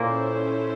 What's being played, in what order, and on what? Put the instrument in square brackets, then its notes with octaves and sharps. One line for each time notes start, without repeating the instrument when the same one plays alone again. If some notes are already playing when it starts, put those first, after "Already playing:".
Already playing: [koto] A#2 A#3 [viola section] C#4 E4 A4 C5